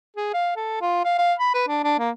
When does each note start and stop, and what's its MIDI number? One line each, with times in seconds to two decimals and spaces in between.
0.17 0.33 68
0.34 0.52 77
0.57 0.79 69
0.81 1.03 65
1.05 1.15 77
1.19 1.34 77
1.39 1.54 83
1.54 1.64 71
1.68 1.81 62
1.84 1.96 62
1.99 2.11 58